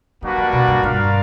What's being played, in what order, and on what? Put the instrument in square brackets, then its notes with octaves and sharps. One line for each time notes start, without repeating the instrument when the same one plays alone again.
[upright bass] F#3 [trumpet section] G3 A#3 D4 F#4 B4
[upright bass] F3
B2
G2
[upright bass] G2 [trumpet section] F4 A#4 D5 F5